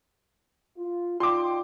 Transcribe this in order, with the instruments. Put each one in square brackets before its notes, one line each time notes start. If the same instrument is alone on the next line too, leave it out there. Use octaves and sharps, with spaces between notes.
[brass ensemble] F4
[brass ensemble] D#4 D5 G5 [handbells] F4 [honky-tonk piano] C6 D6